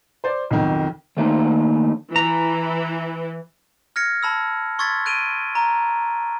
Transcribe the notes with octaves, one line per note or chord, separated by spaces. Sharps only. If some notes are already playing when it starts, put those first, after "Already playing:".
C5 D5
B1 F2 D#3
D#3 A3 A#3 D4 D#4
E3 A#5
F6 G#6 A#6 C#7
A5 B5 E6
C6 C#6 E6 G#6 A6 B6
F#6 D7 D#7 F7 G7
A#5